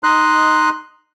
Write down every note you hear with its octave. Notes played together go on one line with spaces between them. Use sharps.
D#4 D#5 C6 F#6